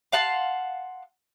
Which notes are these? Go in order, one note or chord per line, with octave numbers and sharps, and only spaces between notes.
F5 F#5 A5 C6